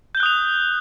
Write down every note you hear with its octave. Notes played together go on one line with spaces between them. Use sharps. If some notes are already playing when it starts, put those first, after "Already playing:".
D#6 F#6 G6 F7 G7